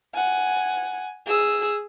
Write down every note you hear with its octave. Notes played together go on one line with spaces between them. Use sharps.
F#5 G#5
G#4 E6